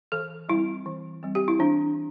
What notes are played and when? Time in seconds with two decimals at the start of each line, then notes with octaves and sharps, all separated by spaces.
0.12 E3 A4
0.49 G3 C4 E4
0.86 E3
1.23 G3 C4
1.35 G4
1.48 E4
1.59 E3 D4